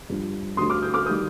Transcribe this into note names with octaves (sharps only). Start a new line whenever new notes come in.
G2 F3
D2 D3 G3 C6 D#6
D6 F6
D#6 G6
D6 F6
D#3 G3 D#6 G6